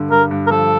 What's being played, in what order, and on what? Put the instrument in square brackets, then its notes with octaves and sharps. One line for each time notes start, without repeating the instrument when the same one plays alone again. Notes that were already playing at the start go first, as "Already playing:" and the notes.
Already playing: [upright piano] G2 D3
[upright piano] G2 [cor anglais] A#4
[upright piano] G2
[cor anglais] A#4
[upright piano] F3 [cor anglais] A4